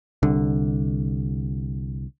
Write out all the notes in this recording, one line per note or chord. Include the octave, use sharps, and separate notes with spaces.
C2 D3